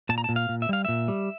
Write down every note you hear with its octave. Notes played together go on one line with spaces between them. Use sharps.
A#2 A5
A#5
A5
A#2
F5
A#2
E5
G3 F5
A#2 E5
G3